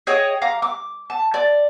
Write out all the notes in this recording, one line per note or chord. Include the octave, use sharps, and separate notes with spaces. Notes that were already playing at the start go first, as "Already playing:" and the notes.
G#4 C#5 D#5 G5
F5 A#5 D6
D6
A5
D5